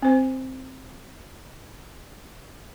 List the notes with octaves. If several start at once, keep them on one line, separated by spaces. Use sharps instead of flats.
C4 C5